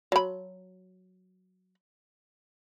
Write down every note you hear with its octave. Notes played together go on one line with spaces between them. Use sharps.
F#3 B5